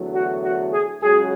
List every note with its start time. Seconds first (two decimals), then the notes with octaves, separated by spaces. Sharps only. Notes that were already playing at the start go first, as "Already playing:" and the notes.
Already playing: E2 D3 F#3 A3
0.16 F#4
0.44 F#4
0.72 G#4
1.01 C#2 C#3 F#3 G#4